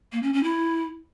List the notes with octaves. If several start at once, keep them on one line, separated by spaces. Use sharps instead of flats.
A#3
C#4
C#4
E4